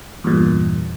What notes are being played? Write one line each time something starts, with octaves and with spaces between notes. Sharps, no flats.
E2 G2 A#2